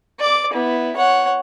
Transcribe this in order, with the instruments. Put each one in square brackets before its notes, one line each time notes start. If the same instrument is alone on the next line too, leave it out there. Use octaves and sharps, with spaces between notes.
[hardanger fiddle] D5 D6
B3 E4
C#5 F#5